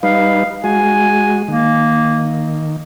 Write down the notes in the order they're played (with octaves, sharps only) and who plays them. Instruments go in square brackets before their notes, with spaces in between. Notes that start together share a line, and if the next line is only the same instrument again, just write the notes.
[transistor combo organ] G3 D#4 B4 [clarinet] F5
[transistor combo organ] G#3 F#4 [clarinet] G#5
[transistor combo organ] D#3 [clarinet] A#3